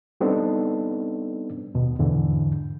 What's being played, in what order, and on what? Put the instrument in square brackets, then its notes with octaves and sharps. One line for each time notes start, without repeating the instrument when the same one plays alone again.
[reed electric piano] G3 B3 C4 D4 D#4 A4
D#2 B2
E2 G#2 D3 E3